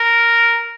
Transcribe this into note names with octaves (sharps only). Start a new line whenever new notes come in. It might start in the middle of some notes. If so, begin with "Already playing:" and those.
Already playing: A#4